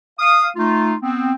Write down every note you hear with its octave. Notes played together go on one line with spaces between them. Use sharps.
F5 D#6
A3 D#4 F4
B3 C4